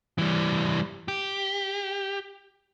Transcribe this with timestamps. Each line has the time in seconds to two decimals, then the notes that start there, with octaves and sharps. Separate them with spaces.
0.18 E3 G3
1.08 G4